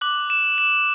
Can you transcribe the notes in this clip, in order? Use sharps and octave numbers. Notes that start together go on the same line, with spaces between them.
D6 F#6 F#7
E7
E7